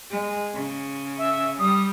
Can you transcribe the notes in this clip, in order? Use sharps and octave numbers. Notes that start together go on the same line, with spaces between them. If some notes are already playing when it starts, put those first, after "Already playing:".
G#3
C#3
E5
G3 D#6